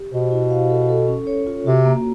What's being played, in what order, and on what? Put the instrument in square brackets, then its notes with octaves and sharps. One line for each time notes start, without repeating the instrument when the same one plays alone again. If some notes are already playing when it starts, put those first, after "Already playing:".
Already playing: [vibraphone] G4
[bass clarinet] B2 [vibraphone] C5
[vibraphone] E4
F5
A4
A4
C#4
C#5
F4
[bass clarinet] C3 [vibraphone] F#4
[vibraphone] A#3